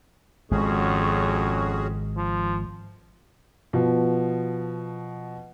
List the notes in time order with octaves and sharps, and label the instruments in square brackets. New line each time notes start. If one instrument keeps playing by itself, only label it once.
[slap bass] G#1 G#3 [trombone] F2 [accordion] C#4 F#4 G#4
[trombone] F3
[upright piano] B2 F3